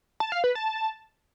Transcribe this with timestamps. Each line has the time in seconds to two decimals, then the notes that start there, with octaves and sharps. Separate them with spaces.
0.20 A5
0.32 F5
0.44 B4
0.55 A5